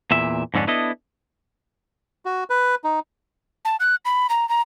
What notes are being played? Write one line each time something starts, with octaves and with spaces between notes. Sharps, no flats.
E2 A#2 E5
F2 G#2 D3 C#4 D4
B3 D4 E4 A4 D#5
F#4
B4
D#4
A5
F#6
B5
A#5
A#5